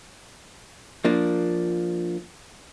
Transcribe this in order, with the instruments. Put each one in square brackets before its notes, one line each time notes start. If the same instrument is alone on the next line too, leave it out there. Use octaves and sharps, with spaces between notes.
[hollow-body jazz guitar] F3 A#3 D4